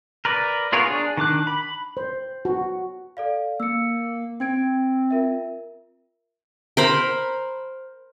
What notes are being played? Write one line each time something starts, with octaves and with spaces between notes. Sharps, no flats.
A#4 B4 D5
B3 F4 G#4 A#4 C#5
D4 G#4
D#3 D4 D6 F#6
B5
C5
F#4
A4 D5 F5
A#3 E6 C#7
C4 G5 G#6 D7
F4 A#4 E5
A#4 C5 B5